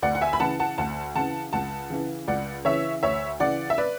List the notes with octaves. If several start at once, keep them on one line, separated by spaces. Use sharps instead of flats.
D2 D5 F#5
F#5
E5 G#5
B5
C#3 E3 F#5 A5
F#5 A5
D2 F#5 A5
C#3 E3 F#5 A5
C#2 F#5 A5
C#3 E3
C#2 D5 F#5
C#3 E3 C#5 E5
D2 C#5 E5
C#3 E3 D5 F#5
E5
B4 D5